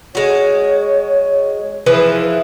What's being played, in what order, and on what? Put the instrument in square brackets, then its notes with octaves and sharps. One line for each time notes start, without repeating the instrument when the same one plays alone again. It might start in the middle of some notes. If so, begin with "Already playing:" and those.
[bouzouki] G#3 F#4 [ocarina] C#5
[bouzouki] E3 F3 G#4 [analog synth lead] B4